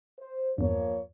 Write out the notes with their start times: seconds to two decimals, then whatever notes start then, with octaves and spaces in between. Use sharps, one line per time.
0.19 C5
0.58 E2 G2 F3 A#3 C#5